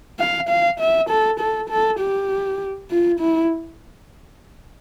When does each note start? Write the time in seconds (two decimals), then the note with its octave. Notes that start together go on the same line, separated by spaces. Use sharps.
0.19 F5
0.49 F5
0.80 E5
1.09 A4
1.40 A4
1.69 A4
1.99 G4
2.90 F4
3.19 E4